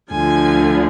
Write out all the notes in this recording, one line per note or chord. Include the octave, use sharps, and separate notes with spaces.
D2 D3 F3 G#5